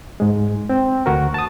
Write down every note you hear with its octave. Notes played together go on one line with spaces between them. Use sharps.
G#2 G#3
C4
D2 F#4 A#4
A5 D#6